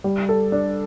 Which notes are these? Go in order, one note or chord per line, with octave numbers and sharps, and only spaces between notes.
G3
A4
D4